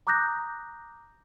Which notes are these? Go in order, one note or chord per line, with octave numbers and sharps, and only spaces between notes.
A#5 D6 D#6 F#6 G6 A#6